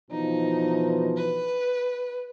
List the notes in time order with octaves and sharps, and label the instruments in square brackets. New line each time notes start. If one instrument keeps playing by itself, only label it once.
[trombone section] B2 E3 F3 [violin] D#4
[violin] B4